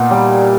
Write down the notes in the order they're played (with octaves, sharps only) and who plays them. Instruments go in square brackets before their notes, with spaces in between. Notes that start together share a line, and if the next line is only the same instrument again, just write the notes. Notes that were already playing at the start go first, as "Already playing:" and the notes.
Already playing: [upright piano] A#2 A#3 [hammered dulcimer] B3 D#4
[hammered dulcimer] G3